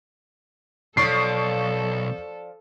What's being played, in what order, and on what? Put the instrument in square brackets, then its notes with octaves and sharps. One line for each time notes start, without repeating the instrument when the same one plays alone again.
[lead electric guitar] B1 C#5 [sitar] F3 D5 [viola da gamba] A4 [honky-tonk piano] C#6 C7